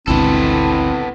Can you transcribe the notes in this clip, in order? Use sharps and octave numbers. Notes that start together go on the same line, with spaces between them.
G#1 D2 B2 B3 C4 E4 A4